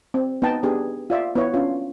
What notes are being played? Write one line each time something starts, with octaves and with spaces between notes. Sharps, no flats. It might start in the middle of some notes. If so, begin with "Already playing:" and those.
C4
B3 D#4 D#5 G5 A5
B3 D4 G4 G#4
F4 D5 E5
B3 E4 C#5
C#4 D4 F4